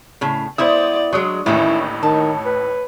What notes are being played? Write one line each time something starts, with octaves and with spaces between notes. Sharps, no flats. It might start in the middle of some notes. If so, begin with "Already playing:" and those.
A2 C#3
B3 E4 C5 D5 E5 D#6
F#3 G#3 D4 C#6 D#6
A1 D#2 A2 D#3 E3 C#4 E4
D#3 C#5 A5
B4